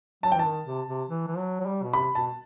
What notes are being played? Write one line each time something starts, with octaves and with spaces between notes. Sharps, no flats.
F#3 A5
G5
E3 A5
D#3
C3
C3
E3
E3
F#3
F#3
G3
B2
C3 B5
B2 A5